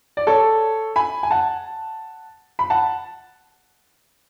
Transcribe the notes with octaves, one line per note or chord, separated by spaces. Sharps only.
D5
A4 C#5
G#5 B5
G#5
F#5 A5
B5
F#5 A5